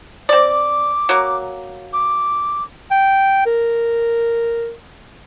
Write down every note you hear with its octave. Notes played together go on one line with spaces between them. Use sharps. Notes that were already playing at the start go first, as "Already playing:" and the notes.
C4 D5 D6
F#3 A#3
D6
G5
A#4